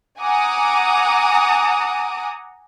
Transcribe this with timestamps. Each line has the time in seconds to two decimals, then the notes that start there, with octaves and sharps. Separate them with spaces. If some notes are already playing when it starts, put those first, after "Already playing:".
0.21 F#5 G#5 A#5 D6 D#6